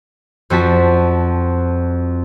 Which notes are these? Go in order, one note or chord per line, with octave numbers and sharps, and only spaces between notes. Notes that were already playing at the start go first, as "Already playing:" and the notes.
F2 C4 F#4 A5 B6